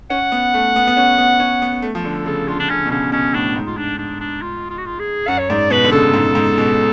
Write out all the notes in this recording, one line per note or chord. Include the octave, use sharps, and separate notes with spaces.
C#4 F#5
B3
A3
B3
B3
C#4
B3
C#4
B3
A3
F3
D3 A4
C#3 A4
D3 F4
D4
D3 C#4
B2
C#3 C#4
B2 C#4
A2 D4
G#2
F4
D4
D4
D4
F4
F4
F#4
F4
G#4
F#2 F#5
C#5
G#2 D5
B2 B4
D3
C#3 A4
G#2
G#2
B2